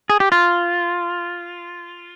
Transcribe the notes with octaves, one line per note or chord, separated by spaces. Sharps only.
G#4
G4
F4